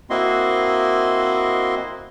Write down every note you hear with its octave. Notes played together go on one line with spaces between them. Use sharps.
A#3 C4 E4 F#4 D#5 C6